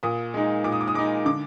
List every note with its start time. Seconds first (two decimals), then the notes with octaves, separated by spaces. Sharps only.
0.03 A#2 D#6
0.34 G#3 D#4
0.64 A#2 D6
0.72 D#6
0.81 D6
0.88 D#6
0.94 G#3 D#4 D6
1.25 D3 D6